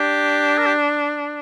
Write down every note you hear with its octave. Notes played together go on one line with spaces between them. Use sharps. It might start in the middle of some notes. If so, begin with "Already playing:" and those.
Already playing: D4 G4
A#4
G4